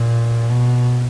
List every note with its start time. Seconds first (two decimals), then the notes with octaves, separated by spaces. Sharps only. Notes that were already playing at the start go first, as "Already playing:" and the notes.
Already playing: A#2
0.50 B2